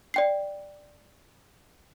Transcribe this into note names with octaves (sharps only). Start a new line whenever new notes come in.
D5 G5 C7